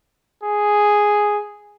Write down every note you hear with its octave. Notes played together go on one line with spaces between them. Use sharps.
G#4